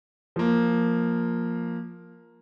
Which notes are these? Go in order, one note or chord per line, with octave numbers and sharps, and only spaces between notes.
F3 A#3